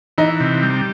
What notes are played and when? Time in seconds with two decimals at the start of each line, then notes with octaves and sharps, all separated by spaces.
0.18 E3 D#4
0.40 C3
0.63 G3